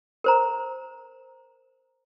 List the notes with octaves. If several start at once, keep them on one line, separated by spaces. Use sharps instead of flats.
A#4 C5 A#5